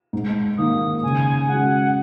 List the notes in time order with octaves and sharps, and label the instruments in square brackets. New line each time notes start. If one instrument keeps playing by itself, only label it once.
[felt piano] G#2
[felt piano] D#3 A#3 [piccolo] D#6
[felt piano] C#3 [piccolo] G#5
[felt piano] G#3 C#4 F#4 [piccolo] F#5